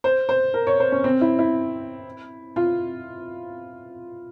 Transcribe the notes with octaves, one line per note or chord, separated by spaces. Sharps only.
C5
C5
A#4
C#5
C5
C#4
C4
E4
E4
F4